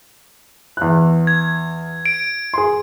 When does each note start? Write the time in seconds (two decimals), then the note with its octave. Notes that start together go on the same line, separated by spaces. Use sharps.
0.77 E2 F#6
1.27 G#6
2.06 D7
2.54 G#4 C6